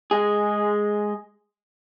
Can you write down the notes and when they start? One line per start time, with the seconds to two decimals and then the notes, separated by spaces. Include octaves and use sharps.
0.11 G#3 G#4